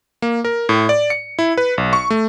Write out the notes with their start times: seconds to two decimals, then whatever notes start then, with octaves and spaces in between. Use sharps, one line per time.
0.22 A#3
0.45 A#4
0.69 A2
0.89 D5
1.10 C#7
1.39 E4
1.57 B4
1.78 B1
1.93 C#6
2.10 A3